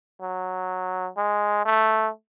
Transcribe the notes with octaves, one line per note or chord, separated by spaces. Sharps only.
F#3
G#3
A3